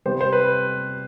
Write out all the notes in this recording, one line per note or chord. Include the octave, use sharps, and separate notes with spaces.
C3 G3 B3 C5
C5
B4